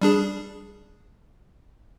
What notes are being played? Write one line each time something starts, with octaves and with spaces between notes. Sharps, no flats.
G3 D4 G#4